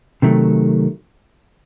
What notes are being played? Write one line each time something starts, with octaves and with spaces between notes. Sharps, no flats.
C3 D#3 F#3 A3